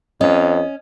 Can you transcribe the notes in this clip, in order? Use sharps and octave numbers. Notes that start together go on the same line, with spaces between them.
F2 C#4 D#5